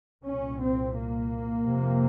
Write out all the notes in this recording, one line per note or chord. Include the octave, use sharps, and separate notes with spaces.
C2 A#2 C#4
C4
A#3
F2 C3